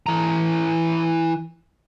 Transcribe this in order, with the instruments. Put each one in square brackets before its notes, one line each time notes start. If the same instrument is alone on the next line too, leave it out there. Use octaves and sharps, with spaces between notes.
[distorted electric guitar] E3 A#5